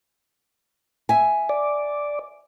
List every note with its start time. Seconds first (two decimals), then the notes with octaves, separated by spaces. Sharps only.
1.09 E5 G#5
1.49 D5